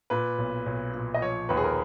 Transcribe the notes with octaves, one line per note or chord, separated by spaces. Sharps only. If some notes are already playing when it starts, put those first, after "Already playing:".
A#2 B4
B1
B1
A#2
D#5
F3 C#5
D#2 B4
G#4
A#4